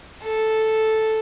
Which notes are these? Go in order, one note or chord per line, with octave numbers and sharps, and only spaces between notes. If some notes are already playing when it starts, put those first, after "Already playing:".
A4